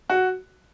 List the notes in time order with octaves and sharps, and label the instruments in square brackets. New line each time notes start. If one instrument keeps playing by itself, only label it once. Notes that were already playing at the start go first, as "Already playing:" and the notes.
[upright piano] F#4